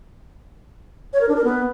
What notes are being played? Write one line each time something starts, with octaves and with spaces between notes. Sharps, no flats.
C#5
A#4
D4
A#4
B3